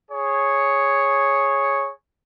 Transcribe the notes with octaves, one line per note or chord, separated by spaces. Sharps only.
G#4 C#5